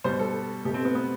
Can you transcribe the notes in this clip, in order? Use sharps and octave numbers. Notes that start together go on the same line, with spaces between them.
B2 G3 C5
A4
B2 A3 G4
C4
B3
B3